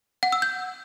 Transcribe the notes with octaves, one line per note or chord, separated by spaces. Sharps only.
F#5
E6
G6